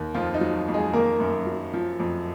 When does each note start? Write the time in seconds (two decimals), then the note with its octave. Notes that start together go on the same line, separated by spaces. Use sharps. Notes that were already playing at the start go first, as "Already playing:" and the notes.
Already playing: D#2
0.15 F2 F3 F4
0.34 D#4
0.41 F#3
0.68 F2
0.74 G#3 G#4
0.93 D#3 A#3 A#4
1.20 F#2
1.47 F#3
1.74 F3
2.00 F2